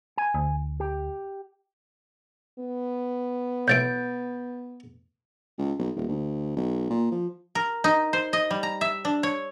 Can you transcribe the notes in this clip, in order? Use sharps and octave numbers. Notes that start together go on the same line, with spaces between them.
G#5
D2
G4
B3
B1 A2 E3 G6 A6 D7
C#2
B1
D#1
D2
B1
A#2
F3
A#4
D#4
C5
D#5
G3
A#5
E5
D4
C#5